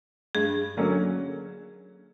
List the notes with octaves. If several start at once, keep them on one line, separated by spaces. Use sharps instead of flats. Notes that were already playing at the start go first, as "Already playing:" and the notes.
G2 G#4
D3 F#3 A#3 C#4